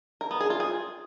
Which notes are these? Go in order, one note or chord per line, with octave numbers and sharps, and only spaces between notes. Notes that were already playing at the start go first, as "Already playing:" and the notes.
A#4
B3
G#4
F4
G#4